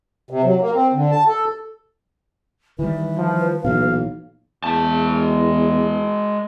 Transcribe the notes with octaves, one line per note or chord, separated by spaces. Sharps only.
C3
F#3
A#3
C4
D3
A5
A4
D#3 E3 G3 B4
F3
B1 A#2 E3 F5
E2 G#3 A5